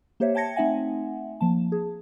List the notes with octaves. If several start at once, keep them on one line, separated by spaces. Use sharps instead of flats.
A#3 G4 C5 C#5 E5
E5 G5 A5 G#6 A#6 C#7
A3 C4 D#4 E5 F#5 G#5
F3 A#3 A5
G#4